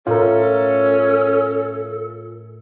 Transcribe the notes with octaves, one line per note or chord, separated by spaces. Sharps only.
A2 C#4 F4 A4 A#4